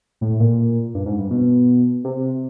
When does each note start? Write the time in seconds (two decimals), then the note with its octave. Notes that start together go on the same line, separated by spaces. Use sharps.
0.21 A2
0.40 A#2
0.94 G2
1.06 G#2
1.18 G2
1.31 B2
2.04 C3